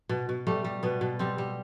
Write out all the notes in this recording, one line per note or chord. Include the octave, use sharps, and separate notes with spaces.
B2
B2
G3 A3
G3
B2 B3
B2
G3 C4
G3